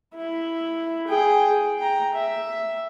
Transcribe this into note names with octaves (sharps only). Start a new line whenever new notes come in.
E4
G#4 G5
G5 A#5
E5